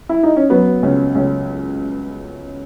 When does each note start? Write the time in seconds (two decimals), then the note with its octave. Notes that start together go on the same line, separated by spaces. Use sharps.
0.09 E4
0.23 D#4
0.36 C#4
0.50 F#3 B3
0.83 C#2 C#4
1.15 C#2 C#4